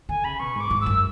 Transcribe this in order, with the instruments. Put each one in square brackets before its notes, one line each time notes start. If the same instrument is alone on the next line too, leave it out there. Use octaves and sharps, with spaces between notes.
[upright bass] D3 [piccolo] G#5
[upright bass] C#3 [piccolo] B5
[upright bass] B2 [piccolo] C#6
[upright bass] G#2
[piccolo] D6
[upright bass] G#2
[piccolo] E6
[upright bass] F#2